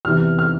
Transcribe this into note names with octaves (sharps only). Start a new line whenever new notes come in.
E2 C3 E3 F6
F6